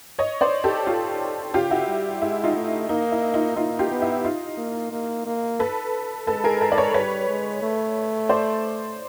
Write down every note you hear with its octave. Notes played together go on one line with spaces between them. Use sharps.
C#5 D#5
C5 D5
G4 A4
F4 G4
C#3 F4 G4
E4 F#4
G3
G#3 E4
D#4 F4
A3
A#3 D#4
E4
D#4 F4
A#3 D#4 F4
F4 G4
B3
E4
D#4 F4
A#3
A#3
A#3
A4 B4
G#3 A4 B4
G#4 A#4
A4 B4
D5
B4 C#5
G3 B4 C#5
G#3
A3
C5 D5